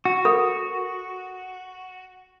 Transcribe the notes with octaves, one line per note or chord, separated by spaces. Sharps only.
F#4
A4 A#4 B5